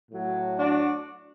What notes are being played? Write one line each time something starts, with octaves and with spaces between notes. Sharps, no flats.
A2 F#3
D4 F#4